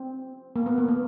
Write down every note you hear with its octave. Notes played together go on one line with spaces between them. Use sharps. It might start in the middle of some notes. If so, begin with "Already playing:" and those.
Already playing: C4
A#3
B3
A#3
B3